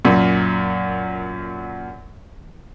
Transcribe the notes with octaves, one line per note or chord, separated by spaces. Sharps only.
F#2 A#2